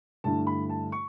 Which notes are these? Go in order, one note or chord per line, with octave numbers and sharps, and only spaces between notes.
G2 D3 A3 E4 A5
B5
A5
C#6